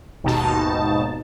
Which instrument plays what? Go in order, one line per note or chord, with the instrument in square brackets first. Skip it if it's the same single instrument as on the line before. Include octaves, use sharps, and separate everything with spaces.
[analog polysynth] G#1 D#2 B2 D#4 A5